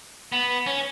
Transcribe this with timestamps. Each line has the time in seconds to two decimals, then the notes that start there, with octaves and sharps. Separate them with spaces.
0.32 B3
0.67 C#4